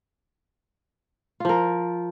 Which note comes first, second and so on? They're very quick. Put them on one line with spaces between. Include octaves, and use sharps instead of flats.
F4 F3 A#4